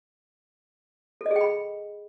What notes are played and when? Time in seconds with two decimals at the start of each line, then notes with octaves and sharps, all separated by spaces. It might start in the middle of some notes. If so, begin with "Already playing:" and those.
1.21 A4
1.26 D#5
1.31 G#4
1.36 G5
1.41 B5